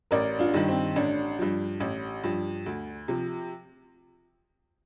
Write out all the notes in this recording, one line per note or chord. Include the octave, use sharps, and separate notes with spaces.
A1 A#4 D5
D4 F4
G2 D#3
C4
A1 D4
G2 F3
A1
G2 F3
D2
C3 F3